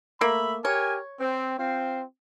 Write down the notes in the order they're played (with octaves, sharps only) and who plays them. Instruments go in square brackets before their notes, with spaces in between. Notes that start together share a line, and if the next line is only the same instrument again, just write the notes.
[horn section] A3 E5 B5 [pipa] A#3
[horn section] G4 A#4 G#5 [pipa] C#5
[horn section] C4
C4 F4 C5